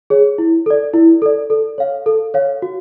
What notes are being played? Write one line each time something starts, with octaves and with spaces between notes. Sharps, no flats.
G#4 C#5
E4
A4 D5
E4
A4 D5
A4
C#5 F5
A4
C#5 F5
F#4